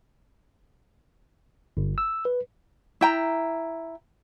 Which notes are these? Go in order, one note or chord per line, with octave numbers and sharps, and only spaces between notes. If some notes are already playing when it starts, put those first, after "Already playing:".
G1
E6
B4
E4 G5 A#5